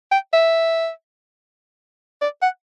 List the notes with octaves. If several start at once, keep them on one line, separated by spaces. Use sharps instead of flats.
G5
E5
D5
F#5